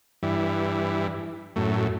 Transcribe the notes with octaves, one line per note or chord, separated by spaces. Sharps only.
G2 E3
F#2 A2